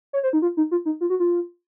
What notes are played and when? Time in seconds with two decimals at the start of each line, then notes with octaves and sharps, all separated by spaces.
0.13 C#5
0.23 C5
0.33 D#4
0.42 F4
0.57 D#4
0.71 F4
0.85 D#4
1.01 F4
1.10 F#4
1.20 F4